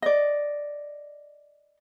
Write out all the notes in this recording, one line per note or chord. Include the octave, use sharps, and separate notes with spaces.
D5 D#5